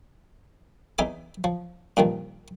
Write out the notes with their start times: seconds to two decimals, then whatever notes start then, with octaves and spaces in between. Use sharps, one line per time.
0.98 E2 D#4 E5 G#5 D6
1.44 F3
1.97 G2 A#2 D#3 F3